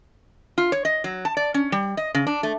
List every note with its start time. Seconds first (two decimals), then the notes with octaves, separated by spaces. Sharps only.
0.58 F4
0.72 C#5
0.85 D#5
1.04 F#3
1.25 A5
1.37 D5
1.54 C#4
1.72 G3
1.97 D#5
2.15 C#3
2.27 D4
2.43 A3